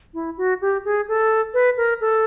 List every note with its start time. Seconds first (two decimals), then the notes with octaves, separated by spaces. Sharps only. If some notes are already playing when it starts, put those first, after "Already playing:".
0.14 E4
0.38 F#4
0.61 G4
0.85 G#4
1.08 A4
1.54 B4
1.77 A#4
2.01 A4